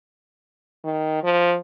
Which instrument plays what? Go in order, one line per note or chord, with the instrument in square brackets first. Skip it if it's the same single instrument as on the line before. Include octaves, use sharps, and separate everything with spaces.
[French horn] D#3
F3